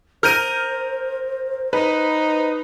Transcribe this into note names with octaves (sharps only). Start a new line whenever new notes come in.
A#4 C5 F6 G6 D#7
D#4 B4